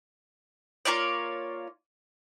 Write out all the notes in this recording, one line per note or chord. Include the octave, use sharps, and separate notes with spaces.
A#3 F4 C#5 D5